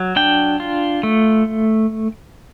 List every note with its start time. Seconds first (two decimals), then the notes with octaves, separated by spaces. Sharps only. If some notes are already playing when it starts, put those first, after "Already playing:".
Already playing: F#3
0.16 D4 G5
0.60 F4
1.03 A3